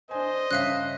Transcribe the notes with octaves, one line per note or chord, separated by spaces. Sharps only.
D4 C5 D#5 G#5
G2 C#3 C#4 E5 F5 F#6